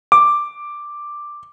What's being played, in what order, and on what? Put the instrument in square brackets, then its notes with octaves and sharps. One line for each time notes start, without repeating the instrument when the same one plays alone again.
[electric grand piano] D6